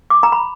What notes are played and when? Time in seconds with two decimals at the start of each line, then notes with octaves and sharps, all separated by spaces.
0.10 D6
0.23 A#5
0.32 B5